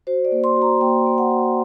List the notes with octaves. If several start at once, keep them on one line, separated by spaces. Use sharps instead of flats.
F#4 C5
D5
A#3
C6
F#4
A#5
A#3 G5
A#3
F#5
F#4